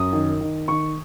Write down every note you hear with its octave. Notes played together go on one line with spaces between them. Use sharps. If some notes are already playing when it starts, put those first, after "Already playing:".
Already playing: F#2 D#6
D#3
D#3
D#3 C#6